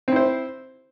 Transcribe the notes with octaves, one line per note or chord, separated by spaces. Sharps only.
C4 E4 C5